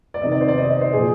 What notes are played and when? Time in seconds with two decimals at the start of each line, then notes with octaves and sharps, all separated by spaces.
0.14 D5
0.22 C3 D#3 D#5
0.32 D5
0.41 C5
0.48 D5
0.58 D#5
0.70 D#5
0.81 C5
0.93 A#2 F3 G#4